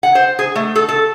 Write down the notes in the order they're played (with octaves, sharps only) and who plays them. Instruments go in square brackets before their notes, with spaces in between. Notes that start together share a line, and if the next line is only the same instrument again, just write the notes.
[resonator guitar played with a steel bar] F#5
C5
G#4
A3
A4
A4